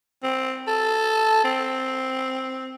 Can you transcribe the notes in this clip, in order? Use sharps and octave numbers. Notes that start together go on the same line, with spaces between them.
C4
A4
C4